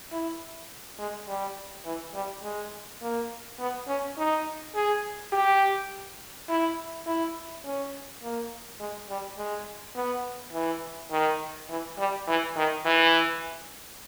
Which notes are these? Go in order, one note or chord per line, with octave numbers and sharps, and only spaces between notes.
E4
G#3
G3
E3
G3
G#3
A#3
B3
C#4
D#4
G#4
G4
E4
E4
C#4
A#3
G#3
G3
G#3
B3
E3
D#3
E3
G3
E3
D#3
E3